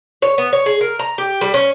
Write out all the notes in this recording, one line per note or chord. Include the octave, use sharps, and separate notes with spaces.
C#5
B3
C#5
G#4
A#4
A#5
G4
G3
C#4